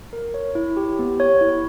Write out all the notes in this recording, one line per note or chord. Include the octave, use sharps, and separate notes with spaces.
A#4
C#5
E4
G4
B3
C#5
E4